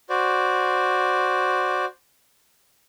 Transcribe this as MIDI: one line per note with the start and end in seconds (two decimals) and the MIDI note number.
0.10 1.85 66
0.10 1.85 72
0.10 1.85 74